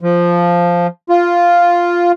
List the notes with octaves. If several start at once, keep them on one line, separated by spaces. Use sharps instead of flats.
F3
F4